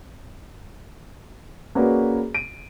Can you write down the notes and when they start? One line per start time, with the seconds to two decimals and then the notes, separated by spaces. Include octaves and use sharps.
1.75 A#3 C#4 F#4 G#4 B4 D5
2.35 D7 D#7